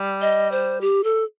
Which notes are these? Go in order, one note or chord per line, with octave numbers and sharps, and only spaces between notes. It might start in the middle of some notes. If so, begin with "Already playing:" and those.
Already playing: G3
D#5
C5
G4
A4